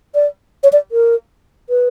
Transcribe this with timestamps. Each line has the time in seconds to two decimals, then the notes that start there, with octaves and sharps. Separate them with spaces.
0.15 D5
0.63 C#5
0.73 D5
0.92 A#4
1.70 B4